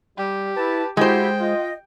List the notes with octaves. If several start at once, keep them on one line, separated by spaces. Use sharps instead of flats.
G3 G4
E4 B4 A5
G#3 E4 F#4 G4 C5 G5
F4 D#5